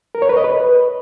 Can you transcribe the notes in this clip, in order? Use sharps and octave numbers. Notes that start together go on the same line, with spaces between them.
A#4
C#5
B4
D#5
B4